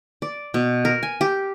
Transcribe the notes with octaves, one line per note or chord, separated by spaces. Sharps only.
D5
B2
A#4
G#5
G4